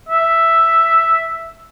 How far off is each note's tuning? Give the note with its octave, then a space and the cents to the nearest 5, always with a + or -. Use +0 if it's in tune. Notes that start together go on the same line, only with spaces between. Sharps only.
E5 +0